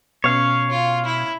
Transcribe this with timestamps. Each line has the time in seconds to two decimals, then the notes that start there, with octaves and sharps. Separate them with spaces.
0.24 B2 C#4 C#5 F5
0.70 F4
1.05 E4